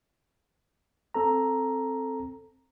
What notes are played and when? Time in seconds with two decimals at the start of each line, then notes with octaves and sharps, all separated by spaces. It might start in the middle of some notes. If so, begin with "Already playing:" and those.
1.14 C4 A4 A#5